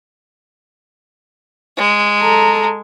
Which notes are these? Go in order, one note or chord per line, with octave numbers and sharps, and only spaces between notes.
G#3
A4 A#5